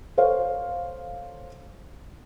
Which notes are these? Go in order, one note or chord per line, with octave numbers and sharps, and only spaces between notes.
A4 C5 C#5 F5